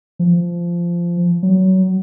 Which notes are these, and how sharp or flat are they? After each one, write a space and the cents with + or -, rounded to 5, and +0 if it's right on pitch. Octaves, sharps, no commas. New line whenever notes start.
F3 -15
F#3 +25